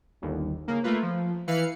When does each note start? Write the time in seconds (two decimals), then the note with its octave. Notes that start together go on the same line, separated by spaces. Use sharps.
0.22 G1 D#2
0.68 C#3 A#3
0.84 A3 A#3 F4 B4
1.02 F3
1.47 E3 B4 F5 C#7